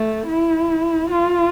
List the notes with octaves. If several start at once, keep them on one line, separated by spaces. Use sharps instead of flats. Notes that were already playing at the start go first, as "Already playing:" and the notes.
Already playing: A3
E4
F4